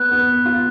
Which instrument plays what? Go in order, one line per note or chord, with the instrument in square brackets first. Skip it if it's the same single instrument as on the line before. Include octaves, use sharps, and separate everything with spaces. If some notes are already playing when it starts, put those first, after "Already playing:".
Already playing: [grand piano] B3 [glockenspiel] F#6
[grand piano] B3
F4